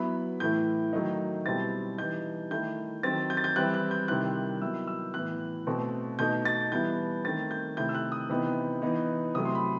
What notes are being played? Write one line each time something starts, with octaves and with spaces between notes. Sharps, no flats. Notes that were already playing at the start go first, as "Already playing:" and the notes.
Already playing: F#3 B3 E4 B5
A2 E3 A3 E4 G6
D#3 F#3 A3 D#4
B2 G3 C4 E4 A6
E3 G3 D#4 G6
D#3 A3 E4 G6
D#3 F#3 C4 A6
G6
A6
G6
E3 G3 C4 E4 F#6
F#6
G6
C3 D#3 G3 C4 E4 F#6
D#3 F#3 B3 E4 E6
E6
A2 E3 B3 E4 F#6
B2 A3 C4
B2 A3 D#4 G6
A6
E3 G3 B3 E4 G6
D#3 A3 C4 A6
G6
C3 D#3 A3 E4 G6
E6
F#6
D#6
C3 E3 B3 D#4
E3 B3 D#4
C3 F#3 A3 E4 D#6
C6
B5